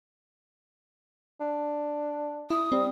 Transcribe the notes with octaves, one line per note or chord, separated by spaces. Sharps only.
D4
E4 D#6
G3 C4